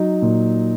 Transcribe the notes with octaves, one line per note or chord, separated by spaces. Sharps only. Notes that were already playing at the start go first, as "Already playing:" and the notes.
Already playing: F#3 D#4
A#2